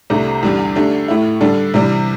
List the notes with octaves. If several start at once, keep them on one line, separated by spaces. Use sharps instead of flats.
C2 C3 A3 D4 G4
E2 D3 G3 D4 G4
D3 A3 D4 G4
A2 A3 E4
D3 G3 D4 A4
C3 E3 G3 D4